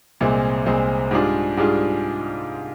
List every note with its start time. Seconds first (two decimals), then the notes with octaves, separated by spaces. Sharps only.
0.21 C2 A#2 G#3 C4
0.66 C2 A#2 G#3 C4
1.11 G#2 G3 D4 F4 G#4
1.57 G#2 G3 D4 F4 G#4